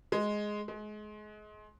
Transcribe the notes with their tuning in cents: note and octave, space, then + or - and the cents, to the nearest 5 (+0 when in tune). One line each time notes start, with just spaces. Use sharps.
G#3 +5
G#3 +30